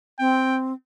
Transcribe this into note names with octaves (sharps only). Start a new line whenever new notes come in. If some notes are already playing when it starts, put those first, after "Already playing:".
C4 G5